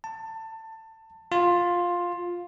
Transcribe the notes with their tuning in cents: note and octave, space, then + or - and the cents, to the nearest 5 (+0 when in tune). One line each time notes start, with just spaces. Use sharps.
A5 +20
F4 +10